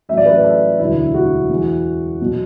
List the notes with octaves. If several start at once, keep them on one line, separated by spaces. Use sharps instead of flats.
A1 A2 F#3 E5
D5
B4
D5
A4
E1 D2 D3 F#3 E4
F#4
E2 E3
B2 F#3